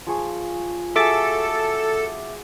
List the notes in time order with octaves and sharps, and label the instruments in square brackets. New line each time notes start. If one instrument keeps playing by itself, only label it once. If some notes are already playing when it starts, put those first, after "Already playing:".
[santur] F3 G#4 C#6
[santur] F#4 G#4 [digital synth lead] A4 [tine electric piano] E5 D6 A6